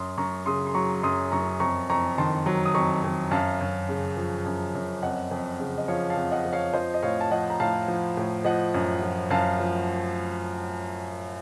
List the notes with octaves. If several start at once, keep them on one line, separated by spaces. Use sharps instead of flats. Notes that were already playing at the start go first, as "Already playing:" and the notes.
Already playing: F#2 C6 D#6
F#2 A#5 C#6
C#3 C6 D#6
C6
F#3 A#5 C#6
F#2 C6 D#6
F#2 A#5 C#6
F2 A#5 C#6
F2 A#5 C#6
D#3 A5 C6
F#3
D#6
F2 A#5 C#6
F2
F#2 F5 A5
F#2
C#3
F3
F#2
F#2
F2 D#5 F#5
F2
C#3
D#5
F3 C#5 F5
F5 A5
F2
D#5 F#5
F2
C#5 F5
F3 C5 D#5
D#5
A2 C#5 F5
A5
F3 D#5 F#5
A#5
A2 F5 A5
F3
A2
F3 D#5 F#5
F#2
F3
F#2 F5 A5
F3